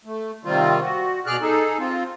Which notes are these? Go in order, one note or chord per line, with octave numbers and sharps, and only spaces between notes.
A3
C3 D#3 G3 C4 F4
F#4
B2 G#4 D5 F6 F#6
D#4 G#4 A4
C4 F4